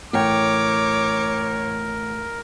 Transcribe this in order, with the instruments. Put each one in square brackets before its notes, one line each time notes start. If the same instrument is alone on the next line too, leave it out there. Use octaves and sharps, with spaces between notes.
[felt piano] A1 G5 [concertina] A#4 [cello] C#5 [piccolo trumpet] D6